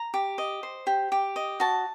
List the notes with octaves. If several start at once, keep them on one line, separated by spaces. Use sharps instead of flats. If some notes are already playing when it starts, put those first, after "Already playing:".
Already playing: A#5
G4
D#5
C5
G4
G4
D#5
F#4 A5